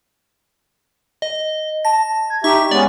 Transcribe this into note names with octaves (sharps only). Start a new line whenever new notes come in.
D#5
A5 A#6
G#6
D#4 G4 E5 C#6
G#3 B3 C#4 D5